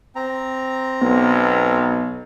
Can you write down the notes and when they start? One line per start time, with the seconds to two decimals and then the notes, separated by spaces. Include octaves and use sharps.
0.16 C4 A#5
1.02 B1 B3